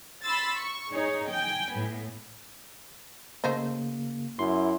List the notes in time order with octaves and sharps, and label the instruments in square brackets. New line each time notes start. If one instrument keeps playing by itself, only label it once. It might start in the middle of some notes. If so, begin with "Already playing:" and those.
[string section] B5 C6 E6 A6
C#6
D#4 G#4 C#5
G5 G#5
A2 B3
[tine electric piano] C#3 A#3 [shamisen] A3 C5 D#5
[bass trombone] F#2 [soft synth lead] E4 [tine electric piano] C6